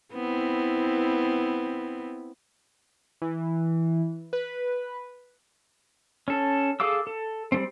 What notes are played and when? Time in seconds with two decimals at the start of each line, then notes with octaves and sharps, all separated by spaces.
0.14 B3 C4 E4
3.22 E3
4.33 B4
6.28 C#4 A4
6.80 G#4 A4 F5 D6 E6
7.07 A4
7.52 G3 A3 C4